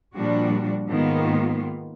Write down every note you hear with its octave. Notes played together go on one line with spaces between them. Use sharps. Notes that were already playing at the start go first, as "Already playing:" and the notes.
A#2 F3 G3 D4 F#4
G#2 D#3 A#3 B3 F4